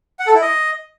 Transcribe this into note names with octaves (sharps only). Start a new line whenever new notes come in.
F#5
A4
E4
D#5